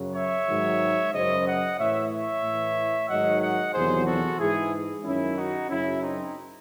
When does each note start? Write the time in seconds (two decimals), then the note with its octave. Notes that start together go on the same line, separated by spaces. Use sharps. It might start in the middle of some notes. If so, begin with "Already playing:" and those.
Already playing: F#2 C#3 F#3
0.15 C#5 E5
0.48 G#2 D#3 F#3
1.13 F#2 C#3 F#3 C5 D#5
1.46 D#5 F#5
1.78 A2 E3 C#5 E5
2.11 C#5 E5
2.43 A2 E3
3.08 G#2 D#3 F#3 D#5 F#5
3.41 D#5 F#5
3.73 E2 C3 D#3 F#3 G#4 C5
4.06 F#4 A4
4.39 G#2 E3 E4 G#4
5.04 F#2 D#3 F#3 C#4 E4
5.37 D#4 F#4
5.70 F#2 C#3 F#3 C#4 E4
6.02 C4 D#4